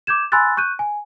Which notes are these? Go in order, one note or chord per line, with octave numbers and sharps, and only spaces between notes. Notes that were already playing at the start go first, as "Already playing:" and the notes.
D6 G6 G#6 E7
G#5 B5 C6 E6 F#6 A6
C#6 F#6 G6 D#7
G#5